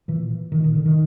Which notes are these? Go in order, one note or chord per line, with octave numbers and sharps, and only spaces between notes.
A#2 E3
A#2 D#3
D#3
D3
D#3